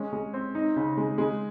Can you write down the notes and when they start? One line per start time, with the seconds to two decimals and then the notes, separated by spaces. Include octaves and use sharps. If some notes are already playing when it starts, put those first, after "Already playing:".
Already playing: G#3 C#4
0.13 G#3
0.34 C4
0.55 D#4
0.76 C#3
0.97 G#3
1.18 G#3